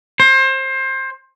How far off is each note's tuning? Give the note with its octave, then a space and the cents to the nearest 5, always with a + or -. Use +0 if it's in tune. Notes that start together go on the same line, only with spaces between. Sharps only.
C5 +25